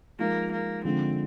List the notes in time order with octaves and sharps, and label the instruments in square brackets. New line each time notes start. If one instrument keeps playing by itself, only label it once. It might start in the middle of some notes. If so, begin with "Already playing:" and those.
[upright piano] F3 G#3 D#4 [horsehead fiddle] A#3
[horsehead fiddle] A#3
[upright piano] D3 F3 G#3 D4 [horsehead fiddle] C4